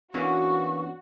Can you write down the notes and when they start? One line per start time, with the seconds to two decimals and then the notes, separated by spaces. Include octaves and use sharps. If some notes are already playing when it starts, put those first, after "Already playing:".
0.14 E3 A#3 B3 C#4 D4 F#4 C#6